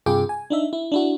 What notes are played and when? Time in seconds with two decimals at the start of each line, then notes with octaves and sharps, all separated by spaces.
0.06 G2 C3 F4 G#4 G5 D6
0.29 G#5
0.50 D4 D#4 E5
0.73 E4
0.92 D4 E4 F#4